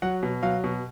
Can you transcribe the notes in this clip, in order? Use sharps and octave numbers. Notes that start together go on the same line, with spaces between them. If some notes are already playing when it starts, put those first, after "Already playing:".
F#3 F#5
B2
F#3 F5
B2